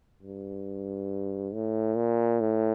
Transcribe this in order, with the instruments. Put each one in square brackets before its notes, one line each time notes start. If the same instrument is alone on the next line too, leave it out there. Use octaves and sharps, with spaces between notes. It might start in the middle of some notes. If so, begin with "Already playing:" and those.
[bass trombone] G2
A2
A#2
A2